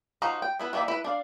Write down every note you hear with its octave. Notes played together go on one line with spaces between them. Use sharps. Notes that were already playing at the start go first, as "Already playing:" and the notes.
F3 D#4 F#4 F5 A#5
G5
B3 E4 B4
D#3 E3 A#3 D5 E5
E4 B4
D4 D5 F5